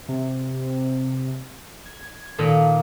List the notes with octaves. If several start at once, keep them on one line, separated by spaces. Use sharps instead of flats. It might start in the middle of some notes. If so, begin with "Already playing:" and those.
C3
G#6
A#2 D#3 A#3 A4